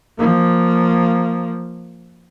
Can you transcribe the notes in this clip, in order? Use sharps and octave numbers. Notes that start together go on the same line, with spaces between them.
F3 A#3